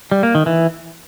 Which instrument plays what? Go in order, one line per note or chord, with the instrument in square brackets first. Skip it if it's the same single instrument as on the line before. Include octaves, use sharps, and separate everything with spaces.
[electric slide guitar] G3
A#3
D#3
E3